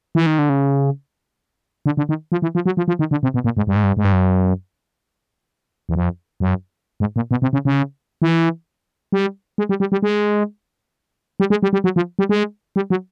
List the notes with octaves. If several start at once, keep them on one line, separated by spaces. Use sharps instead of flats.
E3
D#3
D3
C#3
D3
D3
D#3
F3
E3
F3
F#3
F3
F3
D#3
D3
C3
B2
A#2
G#2
G2
G#2
G2
G#2
G2
F#2
E2
F2
F#2
G#2
A#2
B2
C3
C#3
C#3
E3
G3
G#3
G3
G3
G3
G#3
G3
G#3
G3
G3
F#3
F3
G3
G#3
G3
F#3